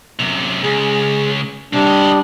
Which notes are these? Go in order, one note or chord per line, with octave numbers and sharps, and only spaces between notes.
F#2 C3
C#2 G#4
C3 G3 C4 D4
D3 D#5